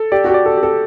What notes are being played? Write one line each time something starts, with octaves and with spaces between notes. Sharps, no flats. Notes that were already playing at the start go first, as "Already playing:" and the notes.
Already playing: A4
G4 D5
F#4
G4
D5
A4
G4
A4